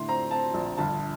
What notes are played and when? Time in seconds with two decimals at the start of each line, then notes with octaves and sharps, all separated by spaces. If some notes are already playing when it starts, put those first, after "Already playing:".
Already playing: A2 D3 C6
0.08 C4 A#5
0.31 C4 A5
0.54 A#1
0.77 G1 A5